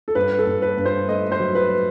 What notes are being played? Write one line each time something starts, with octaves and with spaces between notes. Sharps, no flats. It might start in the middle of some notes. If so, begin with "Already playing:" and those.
A4
G2 B4
A4
G2
B4
G2
C5
A3 D#5
C5
F#3
B4